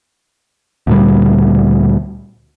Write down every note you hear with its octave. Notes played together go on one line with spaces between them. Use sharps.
D2 A#2 G3